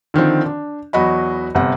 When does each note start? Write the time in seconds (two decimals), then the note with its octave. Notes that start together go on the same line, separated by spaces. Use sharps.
0.14 D3 D#3 F3 C4
0.45 D4
0.93 E2 F#3 F#4 D#5 B5
1.55 G1 C3 F#5